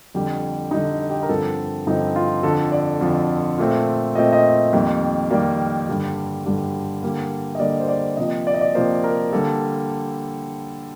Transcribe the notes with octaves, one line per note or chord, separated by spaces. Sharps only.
F2 D3 G3 G4
F2 D3 G3 D#4
G4
A#4
G2 D3 F3 C4 A4
G2 D3 F3 C4 D#4
F4
F2 D3 F3 A4
D5
F2 D3 F3
A#2 A3 C4
A#2 A3 C4 D#5
D#5
F2 D#3 G3 A#3
F2 D#3 G3 A#3 D5
G2 D3 G3
G2 D3 G3
D3 G3 A#3
D#5
D3 G3 A#3 D5
C5
D5
C3 F3 A#3 D#5
D5
D#5
D5
C3 F3 A#3 C5
A#4
D3 G3 A#3 A4